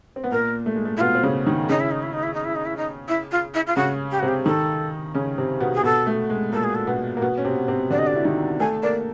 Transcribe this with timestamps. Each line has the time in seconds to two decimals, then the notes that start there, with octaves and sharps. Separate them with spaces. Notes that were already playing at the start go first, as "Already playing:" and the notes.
0.16 C4
0.24 B3
0.31 A#2 A#3 A#4
0.66 A3
0.76 G#3
0.85 A3
0.97 E4
1.00 B2 B3 F4
1.15 C4
1.23 C#3 C#4
1.46 D#3 D#4
1.69 C#3 C#4 D#4
1.80 E4
1.91 D#4
2.02 E4
2.13 D#4
2.23 E4
2.34 D#4
2.44 E4
2.55 D#4
2.65 E4
2.77 D#4
3.08 E4
3.31 F4
3.54 E4
3.67 F4
3.76 C#3 C#4 F#4
4.11 G4
4.19 F#4
4.23 C3 C4
4.28 G4
4.45 D#3 D#4 A4
5.15 C#3 C#4
5.38 C3 C4
5.60 B2 B3
5.75 G#4
5.83 B2 B3 A4
6.07 A3
6.30 G#3
6.52 A#2 A#3 A4
6.63 G#4
6.75 A4
6.87 B2 B3
7.17 A#3
7.22 B2 B3
7.38 C#4
7.45 C3 C4
7.68 C3 C4
7.90 D3 D4 D5
7.98 D#5
8.06 D5
8.16 E4
8.25 D#3 D#4
8.60 A3 A4 G#5
8.83 A#3 A#4 D5